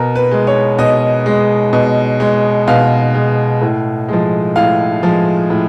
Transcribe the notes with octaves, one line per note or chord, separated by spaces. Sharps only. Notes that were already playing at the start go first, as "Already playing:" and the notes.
Already playing: B2 A#4
B4
G#3
C#5
B2 D#5
G#3
B2
G#3
B2 F5
G#3
A2
F3 G#3
A2 F5
F3 G#3
A2